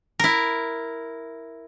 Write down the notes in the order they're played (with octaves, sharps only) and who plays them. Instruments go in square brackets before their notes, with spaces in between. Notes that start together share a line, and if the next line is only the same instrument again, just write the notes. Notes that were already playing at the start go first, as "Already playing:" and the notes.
[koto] E4 A#4